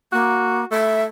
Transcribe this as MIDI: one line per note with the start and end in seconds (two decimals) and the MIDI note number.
0.12 0.65 58
0.12 0.66 66
0.71 1.06 57
0.71 1.02 76